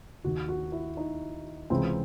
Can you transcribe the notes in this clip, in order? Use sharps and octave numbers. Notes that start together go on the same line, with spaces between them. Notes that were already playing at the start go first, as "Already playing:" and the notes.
D#2 D#3 F#4
F#4
E4
D#4
C#2 C3 E3 C4